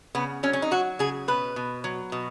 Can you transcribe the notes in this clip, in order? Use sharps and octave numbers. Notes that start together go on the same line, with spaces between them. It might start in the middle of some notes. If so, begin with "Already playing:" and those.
C#3 B3
F#3 C#4
C#4
D#4
F#3 F#4
C#3 G#4
B2 B4
B2
F#3
B2